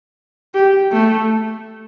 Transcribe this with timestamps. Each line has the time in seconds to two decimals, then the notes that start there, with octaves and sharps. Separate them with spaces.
0.54 G4
0.92 A3